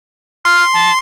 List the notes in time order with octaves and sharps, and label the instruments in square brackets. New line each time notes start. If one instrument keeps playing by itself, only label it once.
[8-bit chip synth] C6 [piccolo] F6
[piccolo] A5